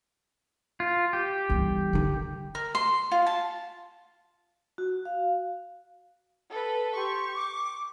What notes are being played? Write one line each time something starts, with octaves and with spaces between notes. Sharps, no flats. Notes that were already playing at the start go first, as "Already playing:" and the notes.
F4
G4
G1 E3
D3 D#3
A#4
C6
F4
A5
F#4
F5
A4 B4
G4 C6 C#6
D6